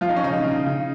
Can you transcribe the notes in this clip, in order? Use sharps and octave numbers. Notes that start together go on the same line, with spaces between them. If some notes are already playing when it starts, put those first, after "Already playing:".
F3 F4
D#4
C#4
C#3 D#4
C#3
C#3